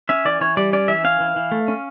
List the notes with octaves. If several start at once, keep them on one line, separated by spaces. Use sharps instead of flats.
C#4 E5
E3 D5
E3 C#5
G3 D5
C#4 D5
E3 E5
C#4 F5
E3
E3
A3
C#4